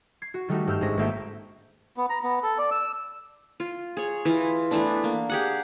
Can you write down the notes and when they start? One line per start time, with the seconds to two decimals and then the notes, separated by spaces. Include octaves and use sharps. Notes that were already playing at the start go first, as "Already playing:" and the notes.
0.22 G#6 C7
0.34 F#4
0.48 D#3 G3 A3 D#4 F#4
0.67 G2 G4 E6 F6 G6
0.81 G#1 G#3 C#4 D4 A#6
0.97 G#1 A3 A#3 D#4 E5 G5
1.97 B3
2.10 A#5
2.23 B3
2.43 A4
2.58 D5
2.71 E6
3.60 F4
3.97 G#4 C#5
4.25 E3 F4
4.71 E3 A3 B3 D4
5.04 A#3
5.30 G4 G#4 F#5